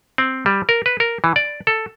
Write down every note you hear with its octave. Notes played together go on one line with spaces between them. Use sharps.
C4
G3
A#4
B4
A#4
E3
D5
A4